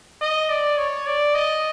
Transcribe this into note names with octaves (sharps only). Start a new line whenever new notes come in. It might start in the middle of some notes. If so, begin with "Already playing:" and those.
D#5
D5
C#5
D5
D#5